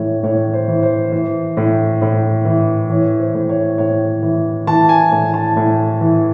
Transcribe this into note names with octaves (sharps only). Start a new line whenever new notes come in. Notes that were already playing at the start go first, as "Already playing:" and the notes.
Already playing: A2 E3 C#5
A2 C#5
C5
E3
C5
E3
A2
A2
E3
E3 C#5
C5
A2
C#5
A2 C#5
E3
E3 A5
G#5
A2 G#5
A5
A2
E3